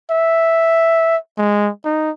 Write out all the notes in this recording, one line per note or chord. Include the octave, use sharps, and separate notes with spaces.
E5
G#3
D#4